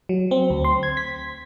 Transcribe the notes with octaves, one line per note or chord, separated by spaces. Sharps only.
F#3
C4
D2
C6
G#6
B6